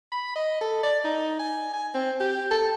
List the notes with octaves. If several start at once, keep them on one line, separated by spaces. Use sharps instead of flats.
B5
D#5
A4
D5
D#4
G#5
G#5
C4
G4
A4